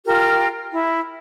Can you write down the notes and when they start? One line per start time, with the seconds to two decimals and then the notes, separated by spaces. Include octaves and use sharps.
0.07 F4 G4 A#4
0.72 E4